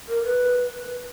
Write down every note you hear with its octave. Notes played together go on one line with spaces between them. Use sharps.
A#4
B4